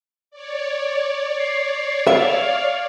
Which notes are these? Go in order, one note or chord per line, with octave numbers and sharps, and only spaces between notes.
C#5 D5
C7
E5 F5